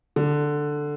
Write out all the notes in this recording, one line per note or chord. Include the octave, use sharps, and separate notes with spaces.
D3